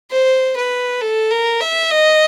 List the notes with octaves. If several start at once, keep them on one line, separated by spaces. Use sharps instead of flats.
C5
B4
A4
A#4
E5
D#5